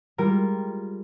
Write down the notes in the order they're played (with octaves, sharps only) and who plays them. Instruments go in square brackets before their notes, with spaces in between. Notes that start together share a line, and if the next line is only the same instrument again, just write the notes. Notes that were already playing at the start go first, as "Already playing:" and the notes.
[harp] G3 G#3 F4 A#4